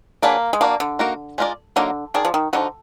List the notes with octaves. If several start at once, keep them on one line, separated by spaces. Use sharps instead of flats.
F#3 A#3 D4 G#4 B4 D5
G#3
A#3 D4 F#4 D5
D3
A#3 D#4 F#4 A#4
G#3 B3 F4 A#4 D5
D3 F#3 A#3 D#4 A#4
D#3 D4 G#4 D5
F3
D#3
D3 F3 G#3 D#4 F#4